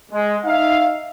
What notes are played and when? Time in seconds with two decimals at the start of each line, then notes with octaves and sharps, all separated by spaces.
0.12 G#3
0.45 D#4 E5 F5